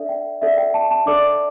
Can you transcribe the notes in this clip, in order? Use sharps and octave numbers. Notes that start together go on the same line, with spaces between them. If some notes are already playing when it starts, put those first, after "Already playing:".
Already playing: D4 A4 D5 E5
G5
D4 A4 D5 E5
G5
A5
A5
D4 A4 D5 D6